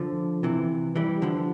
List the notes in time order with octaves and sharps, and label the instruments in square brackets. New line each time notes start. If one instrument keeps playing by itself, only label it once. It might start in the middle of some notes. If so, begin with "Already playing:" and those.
Already playing: [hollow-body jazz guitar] D3 F3
C3 E3
E3 G3
D3 F3